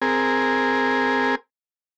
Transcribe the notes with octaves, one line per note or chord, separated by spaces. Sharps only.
C4 G#4 A#4